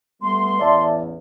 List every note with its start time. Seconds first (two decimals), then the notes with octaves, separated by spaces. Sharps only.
0.22 G3 A3 B3 C6
0.59 A1 E2 D5 E5 A5